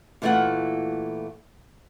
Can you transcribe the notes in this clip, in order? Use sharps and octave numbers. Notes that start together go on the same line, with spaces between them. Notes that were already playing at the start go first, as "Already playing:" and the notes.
A#2 E3 A3 E4 F4 F#5